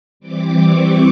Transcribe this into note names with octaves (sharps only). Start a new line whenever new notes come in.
E3 G3 C4 D6
C#6